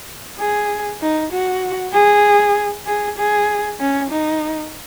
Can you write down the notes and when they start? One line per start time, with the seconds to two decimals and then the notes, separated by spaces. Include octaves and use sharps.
0.39 G#4
1.02 D#4
1.32 F#4
1.94 G#4
2.86 G#4
3.18 G#4
3.80 C#4
4.10 D#4